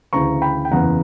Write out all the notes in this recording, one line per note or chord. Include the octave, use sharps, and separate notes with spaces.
D2 C#3 E3 A#5 C#6
G5 B5
G5
F#1 E2 C#3 E3 F#5 A#5